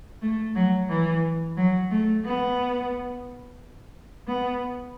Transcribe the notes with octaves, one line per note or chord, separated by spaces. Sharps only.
A3
F#3
E3
F#3
A3
B3
B3